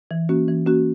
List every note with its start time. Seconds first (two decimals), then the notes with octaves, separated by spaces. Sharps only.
0.11 E3
0.29 A#3 C#4 F#4
0.48 E3
0.66 A#3 C#4 F#4